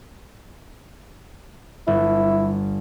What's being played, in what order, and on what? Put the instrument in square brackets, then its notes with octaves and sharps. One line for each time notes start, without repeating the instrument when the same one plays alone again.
[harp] G1 [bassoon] E4